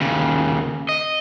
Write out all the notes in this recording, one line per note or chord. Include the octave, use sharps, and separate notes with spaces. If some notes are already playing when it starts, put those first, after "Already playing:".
D#2 C#3
D#5